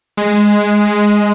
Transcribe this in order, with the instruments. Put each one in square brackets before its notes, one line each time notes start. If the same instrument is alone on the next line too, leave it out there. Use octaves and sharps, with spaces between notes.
[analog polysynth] G#3